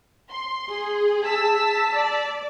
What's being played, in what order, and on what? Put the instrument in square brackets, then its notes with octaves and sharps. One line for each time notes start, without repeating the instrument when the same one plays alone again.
[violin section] C6
[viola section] G#4
[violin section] A5 E6 B6
[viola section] D5